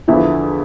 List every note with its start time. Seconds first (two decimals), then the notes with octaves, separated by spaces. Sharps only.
0.08 E2 D3 E3 F3 E4